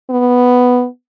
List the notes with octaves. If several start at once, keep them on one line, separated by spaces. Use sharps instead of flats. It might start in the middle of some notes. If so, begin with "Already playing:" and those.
B3